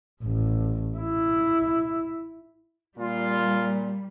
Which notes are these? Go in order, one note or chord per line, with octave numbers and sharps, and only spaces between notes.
A1
E4
A#2 G3 F4